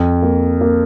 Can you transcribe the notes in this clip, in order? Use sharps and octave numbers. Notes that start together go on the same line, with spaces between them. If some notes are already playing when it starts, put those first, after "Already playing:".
Already playing: F2
A#3
A#3